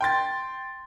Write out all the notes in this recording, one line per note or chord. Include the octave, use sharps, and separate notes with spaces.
G5 C6 A6